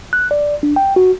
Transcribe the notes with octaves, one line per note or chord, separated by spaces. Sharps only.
F#6
D5
D4
G5
F#4